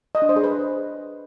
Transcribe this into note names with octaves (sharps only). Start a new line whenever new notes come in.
D#5
D4
C5
G#4
B4